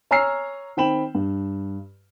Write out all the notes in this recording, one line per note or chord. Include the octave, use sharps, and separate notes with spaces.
C#5 G#5 A#5 E6 F6 C7
D#3 C4 G5 B5 E7 F#7
G2